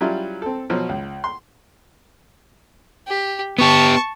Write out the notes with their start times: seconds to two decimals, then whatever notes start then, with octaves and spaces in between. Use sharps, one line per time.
0.01 F#3 G3 C#4 E4 F4
0.42 C4 A4
0.70 B2 F3 F#3
0.89 C#2
1.24 C6
3.07 G4
3.58 B3 G4 A5 C#6